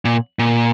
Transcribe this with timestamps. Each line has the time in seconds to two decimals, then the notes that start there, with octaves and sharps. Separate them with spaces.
0.05 A#2
0.39 A#2